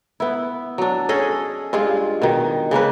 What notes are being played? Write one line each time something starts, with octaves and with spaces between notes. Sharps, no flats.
B3 E4
F#3 D4
C#4 G#4 A4 D#5
G2 G#3 F4 G#4
B2 D#3
C#3 G#3 A#3 B4